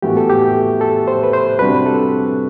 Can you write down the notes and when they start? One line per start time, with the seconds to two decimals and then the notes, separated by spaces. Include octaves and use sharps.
0.02 A2 E3 B3 F#4 G4
0.17 A4
0.30 G4
0.81 A4
1.08 C5
1.23 B4
1.33 C5
1.59 C3 G3 D4 F#4 B4
1.86 A4